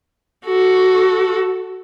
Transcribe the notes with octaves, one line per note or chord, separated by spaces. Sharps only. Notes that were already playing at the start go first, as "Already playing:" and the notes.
F#4 A4